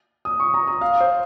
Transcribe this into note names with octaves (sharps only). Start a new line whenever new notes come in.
D#6
C#6
A#5
D#6
F5
C5